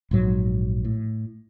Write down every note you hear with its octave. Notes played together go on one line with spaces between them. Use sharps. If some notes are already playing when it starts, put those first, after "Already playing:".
A#1 G#2 F#3
A2